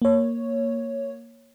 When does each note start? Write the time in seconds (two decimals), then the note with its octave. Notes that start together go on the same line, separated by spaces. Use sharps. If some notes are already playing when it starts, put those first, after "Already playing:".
0.02 A#3 C#5